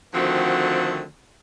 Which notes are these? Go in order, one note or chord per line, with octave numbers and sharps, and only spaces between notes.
D3 D#3 F3 A3 C4 F#4